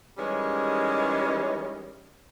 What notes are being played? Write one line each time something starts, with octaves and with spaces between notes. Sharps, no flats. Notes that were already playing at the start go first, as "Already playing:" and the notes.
D#3 E3 G3 G#3 C#4